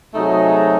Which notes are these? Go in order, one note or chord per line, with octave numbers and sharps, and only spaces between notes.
C3 F#3 A3 D#4 G#4